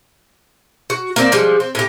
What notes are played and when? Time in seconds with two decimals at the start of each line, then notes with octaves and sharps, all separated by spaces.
0.90 F#4
1.16 A#3 C4 D5
1.32 F3 G3 G#3
1.60 C4
1.75 A2 G4